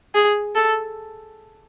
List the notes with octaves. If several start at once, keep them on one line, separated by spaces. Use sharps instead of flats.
G#4
A4